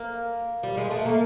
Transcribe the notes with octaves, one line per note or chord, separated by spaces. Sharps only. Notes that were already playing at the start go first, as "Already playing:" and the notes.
Already playing: A#3
G3
G#3
A3
A#3